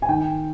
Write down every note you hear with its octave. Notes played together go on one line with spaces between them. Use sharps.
G#5
D#3 G5